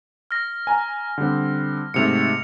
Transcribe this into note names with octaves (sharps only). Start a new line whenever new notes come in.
F6 A#6
G#5 A#5
D3 G3 C4
G#2 C3 A3 C#7 F7